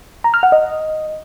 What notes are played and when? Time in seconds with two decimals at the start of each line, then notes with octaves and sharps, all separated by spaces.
0.24 A#5
0.34 F6
0.43 F#5
0.52 D#5